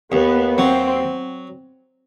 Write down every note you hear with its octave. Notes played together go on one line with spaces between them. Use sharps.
D#2 B3
F#3 C4